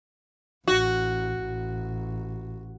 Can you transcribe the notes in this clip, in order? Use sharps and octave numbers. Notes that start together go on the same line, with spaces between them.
A1 F#4
A1